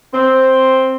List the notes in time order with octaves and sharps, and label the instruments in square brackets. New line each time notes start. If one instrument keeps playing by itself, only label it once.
[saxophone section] C4